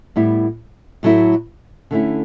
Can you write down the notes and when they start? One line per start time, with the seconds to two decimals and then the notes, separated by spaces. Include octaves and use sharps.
0.16 A2 G3 B3 E4
1.03 A2 F#3 A3 E4
1.91 D3 A3 C#4 E4